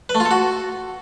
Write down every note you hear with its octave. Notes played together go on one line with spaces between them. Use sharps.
B4
A3
F4
A4
F#4